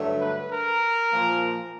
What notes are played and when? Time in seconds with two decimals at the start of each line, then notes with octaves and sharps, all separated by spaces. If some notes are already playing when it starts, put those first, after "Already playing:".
Already playing: G2 D3 F#3 A3
0.21 B4
0.52 A#4
1.11 A#2 F3 A#3